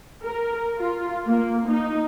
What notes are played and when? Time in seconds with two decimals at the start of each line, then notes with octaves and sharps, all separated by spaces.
0.23 A#4
0.79 F4
1.27 A#3
1.68 D#4